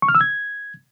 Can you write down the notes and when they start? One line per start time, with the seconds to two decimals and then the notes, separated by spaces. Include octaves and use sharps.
0.02 C#6
0.08 F6
0.15 E6
0.21 G#6